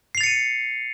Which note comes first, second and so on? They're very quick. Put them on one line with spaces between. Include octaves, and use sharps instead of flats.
C7 F7 A6 C#7 D#7